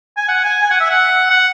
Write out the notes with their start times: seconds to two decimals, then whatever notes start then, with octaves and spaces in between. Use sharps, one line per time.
0.17 G#5
0.28 F#5
0.44 G#5
0.62 G#5
0.70 F#5
0.80 E5
0.90 F#5
1.30 F#5